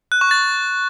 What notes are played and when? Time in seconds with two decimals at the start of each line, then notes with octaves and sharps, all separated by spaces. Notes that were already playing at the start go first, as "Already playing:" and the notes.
0.12 F#6
0.21 C#6
0.31 A6